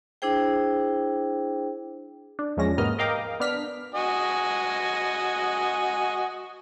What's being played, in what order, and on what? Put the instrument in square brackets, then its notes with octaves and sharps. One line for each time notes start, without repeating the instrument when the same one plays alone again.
[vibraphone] D4 E4 G#4 C5 G5
[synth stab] D4
E2 F3 G#3 C#4 A#6
G#2 C3 A#3 B3 D#5 F6
A#4 D#5 F5 G5 A#5 D6
B3 D4 F6 B6
[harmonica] F#4 D#5 G#5